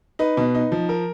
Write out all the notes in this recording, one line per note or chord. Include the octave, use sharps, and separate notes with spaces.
D#4 B4
B2
D#4
F3
A#4